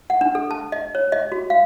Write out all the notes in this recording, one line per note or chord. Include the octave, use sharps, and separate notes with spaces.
F#5
D4
A4
A5
D#5
C#5
D#5
F#4
F5